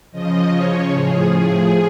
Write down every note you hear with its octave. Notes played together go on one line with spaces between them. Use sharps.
C#3 F3 D#5
C#5
A2 F3 G#4
G#4